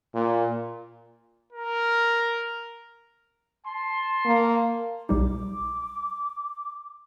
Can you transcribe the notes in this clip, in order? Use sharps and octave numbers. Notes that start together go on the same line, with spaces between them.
A#2
A#4
A5 C6
A#3
B1 G3 D#4 D6